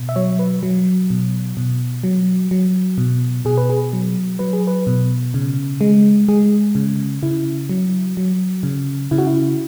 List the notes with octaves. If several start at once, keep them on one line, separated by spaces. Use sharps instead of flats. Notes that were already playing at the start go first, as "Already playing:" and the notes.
Already playing: B2
E5
F#3 C#5
B4
F#3
B2
B2
F#3
F#3
B2
B2 G#4
B4
G#4
F#3
F#3 B4
G#4
B4
B2
C#3
G#3
G#3 G#4
C#3
C#3 E4
F#3
F#3
C#3
C#3 E4
F#4
E4